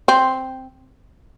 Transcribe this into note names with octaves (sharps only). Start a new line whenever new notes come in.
C4